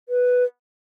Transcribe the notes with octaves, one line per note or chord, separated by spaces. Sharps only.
B4